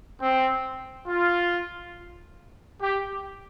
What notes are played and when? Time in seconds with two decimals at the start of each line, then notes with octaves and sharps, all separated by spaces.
0.22 C4
1.08 F4
2.81 G4